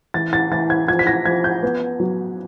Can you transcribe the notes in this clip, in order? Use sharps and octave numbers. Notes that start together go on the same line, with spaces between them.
E3 A6
A6
E3 A6
G#6
F3 G#6
B6
A#6
F3 G#6
G6
B3
F#3